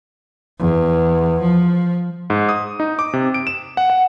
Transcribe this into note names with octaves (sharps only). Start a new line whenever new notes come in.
E2
F3
G#2
D#6
D#4
D6
C3
D7
E7
F#5
F#5